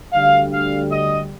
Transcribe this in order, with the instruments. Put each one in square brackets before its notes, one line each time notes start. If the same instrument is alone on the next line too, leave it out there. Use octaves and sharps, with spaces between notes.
[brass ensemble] D2 D3 G3 F5
F5
D#5